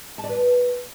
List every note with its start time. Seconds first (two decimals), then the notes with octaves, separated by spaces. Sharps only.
0.18 A5
0.24 D5
0.29 B4